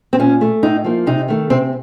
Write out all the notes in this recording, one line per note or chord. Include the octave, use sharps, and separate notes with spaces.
C4
A#2 C#4
A3
A2 D#4
F3 A#3
C3 D#4
D#3 A3
C3 C4